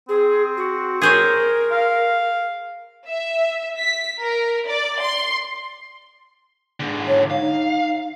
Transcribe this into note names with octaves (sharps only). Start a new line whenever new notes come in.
C4 G#4
F#4
G#4 A#4 C5 C#5
F5
E5
B6
A#4
D5
C6
G#2 D3
C#5
D#4 F5